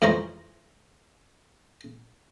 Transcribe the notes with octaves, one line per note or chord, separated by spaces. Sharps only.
F2 E3 G#3 C5 C#5 A#5